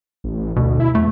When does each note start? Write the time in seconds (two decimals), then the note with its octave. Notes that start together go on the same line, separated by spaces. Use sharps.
0.24 A1
0.56 D2 B2
0.80 E4
0.95 E2 A3